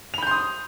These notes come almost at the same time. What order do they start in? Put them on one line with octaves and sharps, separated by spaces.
F7 B5 G6 C6 D#6